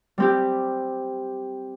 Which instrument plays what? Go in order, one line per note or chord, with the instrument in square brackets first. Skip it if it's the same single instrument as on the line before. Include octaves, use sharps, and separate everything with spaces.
[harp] G3 C4 G4